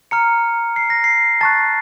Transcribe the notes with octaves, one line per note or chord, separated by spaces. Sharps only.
A#5 F6 C#7
C7
A#6
C7
A5 C#6 F#6 A6